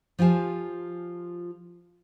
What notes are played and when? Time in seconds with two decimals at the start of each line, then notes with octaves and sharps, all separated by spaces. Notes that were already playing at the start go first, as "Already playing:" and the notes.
0.19 F3 F4 G4 G#5 A5